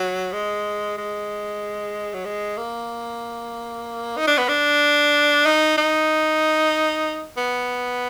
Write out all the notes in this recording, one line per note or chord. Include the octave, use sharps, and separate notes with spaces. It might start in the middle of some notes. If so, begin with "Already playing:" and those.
Already playing: F#3
G#3
G#3
F#3
G#3
A#3
D#4
D4
B3
D4
D#4
D#4
B3